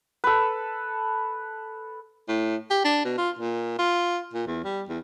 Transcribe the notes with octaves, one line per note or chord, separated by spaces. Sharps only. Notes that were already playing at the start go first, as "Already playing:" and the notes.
A4 B4
A2
G4
D4
B2
F4
A#2
F4
A#2
E2
G3
E2